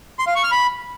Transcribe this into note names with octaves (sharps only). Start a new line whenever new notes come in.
C6
F5
C#6
F6
B5